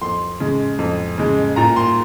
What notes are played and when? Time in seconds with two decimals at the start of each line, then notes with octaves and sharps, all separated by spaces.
0.01 F2 C6
0.40 C#3 G#3
0.79 F2
1.18 C#3 G#3
1.56 A#2 A#5
1.76 C6